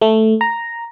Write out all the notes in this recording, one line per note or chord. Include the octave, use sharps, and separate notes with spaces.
A3
A#5